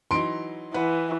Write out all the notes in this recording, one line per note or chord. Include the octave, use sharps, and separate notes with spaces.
E3 F#3 D#4 C6 D7
E3 B4 F#5